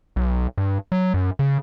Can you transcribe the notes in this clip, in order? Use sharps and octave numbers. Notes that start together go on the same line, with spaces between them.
B1
G2
F#3
F#2
C#3